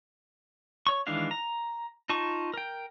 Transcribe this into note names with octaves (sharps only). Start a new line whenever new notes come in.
C#5 C#6
D#3 E3 G#3 D4 F5
A#5
D#4 F4 A5 C#6
A#4 G5